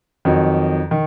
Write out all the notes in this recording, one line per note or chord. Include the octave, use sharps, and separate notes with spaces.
F2 D#3 F#3
D#3